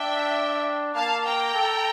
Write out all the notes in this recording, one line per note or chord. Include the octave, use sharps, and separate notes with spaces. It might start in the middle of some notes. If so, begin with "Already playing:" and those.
Already playing: D4 E5 G5
A#3 F5 A5
G5 A#5
A4